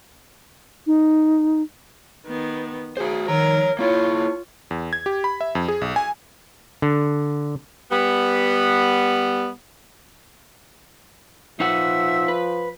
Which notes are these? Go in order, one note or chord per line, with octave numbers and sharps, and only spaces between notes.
D#4
D#3 B3
F#4 G#4 C5
D#3 A#4 C#5 A#5
A#3 E4 F4 C#5
E2
G#6
G4
B5
E5
F2
G#4
B1
G#5
D3
G3 B3
F3 D#4 B4 E5 F#5
B4